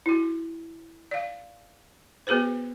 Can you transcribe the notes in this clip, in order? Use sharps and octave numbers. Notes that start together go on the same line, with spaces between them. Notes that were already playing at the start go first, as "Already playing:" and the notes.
E4 F#4
D5 F5
B3 F#4 G#4 B4 C5